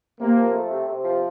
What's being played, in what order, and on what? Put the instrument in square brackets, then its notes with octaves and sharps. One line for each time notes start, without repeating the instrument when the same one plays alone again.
[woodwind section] C3 [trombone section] A#3
[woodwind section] F3
A3
C3
C3
F3